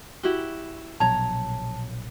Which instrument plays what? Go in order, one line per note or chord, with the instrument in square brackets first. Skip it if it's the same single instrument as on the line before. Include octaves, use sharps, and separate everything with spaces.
[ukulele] E4 F#4 G4
[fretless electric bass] A#1 B2 F#3 [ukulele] C#5 A#5 [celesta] A5